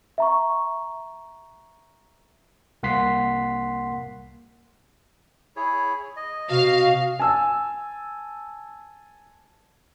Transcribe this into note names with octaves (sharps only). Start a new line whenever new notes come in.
E5 A#5 C#6
C2 A#3 F#5 C6 B6 C7
E4 G#4 C#5
D#5
C3 F#4 F5
G#5 A5 E6